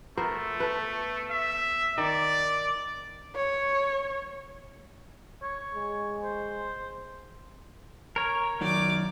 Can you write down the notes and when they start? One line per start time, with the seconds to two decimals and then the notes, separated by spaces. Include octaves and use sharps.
0.18 A3 B3 A#4 C5
0.60 A4 B4
1.30 E5
1.98 D#3 D5
3.36 C#5
5.42 C#5
5.74 G#3
6.23 C5
8.16 A#4 C#5
8.61 F#2 D#3 D5 D6